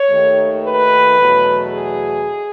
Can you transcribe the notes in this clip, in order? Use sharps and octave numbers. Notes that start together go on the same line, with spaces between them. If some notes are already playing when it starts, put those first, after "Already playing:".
Already playing: C#5
D#2 D#3 A3
B4
E2 B2 F#3 A3
G#4